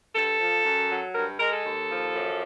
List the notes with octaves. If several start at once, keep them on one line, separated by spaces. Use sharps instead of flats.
G2 A4
F3
F#2
F#3
G2 A#4
G#3 A#4
A4
D#2
F3
F#2